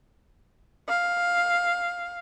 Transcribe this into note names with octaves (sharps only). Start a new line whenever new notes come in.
F5